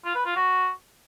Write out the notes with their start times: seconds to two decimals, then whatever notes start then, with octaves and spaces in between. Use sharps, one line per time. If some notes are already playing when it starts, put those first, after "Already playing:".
0.05 F4
0.15 B4
0.25 F4
0.35 F#4